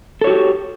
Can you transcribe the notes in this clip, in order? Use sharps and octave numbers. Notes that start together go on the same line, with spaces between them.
F#4 G4 A4 C#5